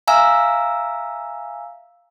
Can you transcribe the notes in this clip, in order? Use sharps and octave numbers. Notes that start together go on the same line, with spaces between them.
E5 F5 G#5 A#5 E6